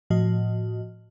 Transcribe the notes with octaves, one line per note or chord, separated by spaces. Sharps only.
A2 F3 F#4 D#5